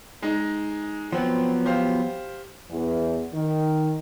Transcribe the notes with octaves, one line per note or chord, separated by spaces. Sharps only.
G#3 D#4
F3 F#3 B3 C4
G4 C5 F5
E2
D#3